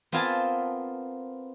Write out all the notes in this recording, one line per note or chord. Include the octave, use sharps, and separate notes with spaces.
B3 C4 F4 A#4 G#5 A5